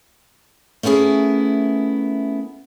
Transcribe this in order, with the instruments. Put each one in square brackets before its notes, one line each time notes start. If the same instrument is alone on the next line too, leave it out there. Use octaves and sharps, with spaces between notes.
[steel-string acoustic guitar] A3 B3 C#4 E4 G#4 A#4